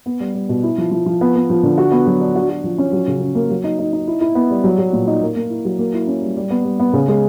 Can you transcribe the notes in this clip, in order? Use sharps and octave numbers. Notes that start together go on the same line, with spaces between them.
B3
G3
G3
B2
E4
F3
F3
F3
B3
B3
F3
D3
F#4
B3
F#3
D4
F#4
F#4
F3
C#4
F#3
C#3
C#3
A#3
F#3
D#4
D#4
D#4
E4
E4
B3
G3
F#3
F#3
A#2
D#4
A#3
A#3
E4
F#3
A#3
E4
C#4
G3
G3
B3
G3
B3
C#3
G#3